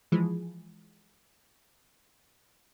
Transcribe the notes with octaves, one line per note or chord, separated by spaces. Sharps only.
E3 F3 G#3